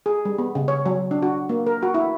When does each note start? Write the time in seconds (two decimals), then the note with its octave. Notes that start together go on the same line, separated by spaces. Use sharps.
0.06 G#4
0.25 G3
0.38 B3
0.55 C#3
0.68 C#5
0.86 F#3
1.11 D4
1.23 F#4
1.49 A#3
1.66 A#4
1.83 F#4
1.94 E4